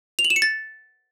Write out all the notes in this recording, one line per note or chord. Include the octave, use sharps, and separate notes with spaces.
F7
F#7
E7
C#7
A6